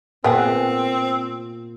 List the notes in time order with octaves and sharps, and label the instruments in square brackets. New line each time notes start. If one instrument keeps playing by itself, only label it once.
[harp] A#2 [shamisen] B3 G#4 F#5 [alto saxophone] C4 [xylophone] G5